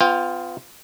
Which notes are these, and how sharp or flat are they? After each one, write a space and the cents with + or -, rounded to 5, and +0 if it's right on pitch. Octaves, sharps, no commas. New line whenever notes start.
B3 +35 F4 +0 G5 +25